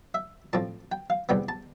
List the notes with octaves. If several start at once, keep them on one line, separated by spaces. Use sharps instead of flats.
E5
A2 F3 C4 A5
G5
F5
E2 C3 G3 B3 G5
A5